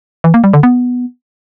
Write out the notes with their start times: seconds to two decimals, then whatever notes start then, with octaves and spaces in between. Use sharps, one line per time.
0.24 E3
0.34 A#3
0.44 G3
0.53 D3
0.63 B3